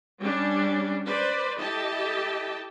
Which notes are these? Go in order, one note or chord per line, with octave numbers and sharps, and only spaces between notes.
G3 C#4 D4
B4 C5 D5
E4 G4 A4 D#5 G5 A5